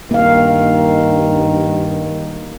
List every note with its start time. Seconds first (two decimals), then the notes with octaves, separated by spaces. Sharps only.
0.11 G2 D#3 A#3 F5